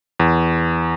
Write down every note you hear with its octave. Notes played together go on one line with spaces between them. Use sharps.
E2